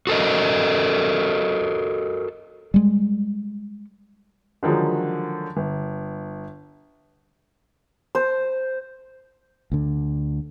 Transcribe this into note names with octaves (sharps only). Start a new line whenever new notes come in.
F#4 A4 A#4 D#5
G3 G#3
D3 D#3 F3 F#3 G#3
G1
C5
D2 D3